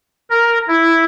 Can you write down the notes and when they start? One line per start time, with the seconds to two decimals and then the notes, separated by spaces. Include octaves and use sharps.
0.30 A#4
0.68 E4